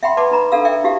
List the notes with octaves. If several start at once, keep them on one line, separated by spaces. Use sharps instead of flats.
E5 F#5 G5 B5 C6
B4 D5 F#5 A5 C6 D6
D#4 B4 A#5 B5
D4 A4 A#4 F5 F#5 E6
A4 A#4 D5 E5 G5
E4 F#4 G4 E5 F5